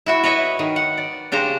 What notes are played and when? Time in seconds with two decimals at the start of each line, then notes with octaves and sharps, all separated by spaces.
0.06 E4 F#4 E5
0.23 B4 C#5 D#5 E5
0.59 D#3
0.76 F#5
0.98 D5
1.32 C#3 D4 G4 C5 A#5